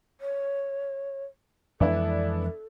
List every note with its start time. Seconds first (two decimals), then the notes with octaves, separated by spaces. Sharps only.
0.21 C#5
1.80 F2 E3 G#3 B3 D4 E4 A4